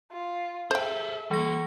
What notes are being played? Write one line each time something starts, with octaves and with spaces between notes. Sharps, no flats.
F4
G#4 A4 C5 E5 G5
E3 G3 A#3 C#6 A#6